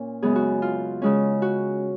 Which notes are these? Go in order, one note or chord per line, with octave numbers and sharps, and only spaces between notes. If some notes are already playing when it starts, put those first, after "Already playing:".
Already playing: A#2 C#4
F#2 C#3 G#3 B3 G#4
F#4
F4
C#3 G#3 C#4
F#4